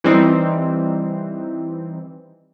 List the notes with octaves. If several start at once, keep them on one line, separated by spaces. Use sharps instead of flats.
E3 G3 C4 D#4